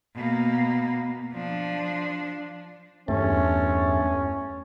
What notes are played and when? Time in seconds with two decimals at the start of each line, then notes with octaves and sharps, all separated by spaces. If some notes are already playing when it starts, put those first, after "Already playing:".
0.15 B2 A#3
1.33 F3 D4
3.08 E2 G2 A3 C#4